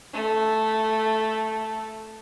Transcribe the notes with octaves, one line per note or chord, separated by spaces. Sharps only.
A3 A4